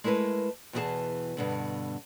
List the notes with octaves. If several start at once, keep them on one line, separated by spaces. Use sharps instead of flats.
G#3 A3 E4 A#4 B4
E2 B2 E3 F#4 G#4 A5
G2 B2 D3